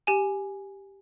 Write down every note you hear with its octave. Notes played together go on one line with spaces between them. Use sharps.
G4 G#5